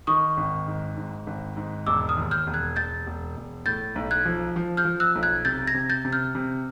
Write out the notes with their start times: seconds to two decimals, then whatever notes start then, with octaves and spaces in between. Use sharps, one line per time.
0.07 D#3 C#6 D#6
0.37 G#1
0.67 G#2
0.97 G#2
1.27 G#1
1.56 G#2
1.87 E1 D6 E6
2.09 D#6 F6
2.16 D#2
2.31 F6 G6
2.47 E1
2.54 F#6 G#6
2.76 E1 G6 A6
3.07 E1
3.36 E1
3.65 A2 G6 A6
3.96 B1
4.11 F#6 G#6
4.25 F3
4.56 F3
4.77 F6 G6
4.85 F3
5.00 E6 F#6
5.15 B1
5.23 F#6 G#6
5.45 C3 G6 A6
5.67 G#6 A#6
5.74 C3
5.89 G6 A6
6.05 C3
6.12 F6 G6
6.35 C3